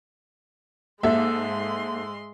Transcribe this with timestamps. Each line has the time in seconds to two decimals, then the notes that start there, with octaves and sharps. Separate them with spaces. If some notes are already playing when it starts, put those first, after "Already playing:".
1.03 G#2 G#3 A#3 A4 E5 C6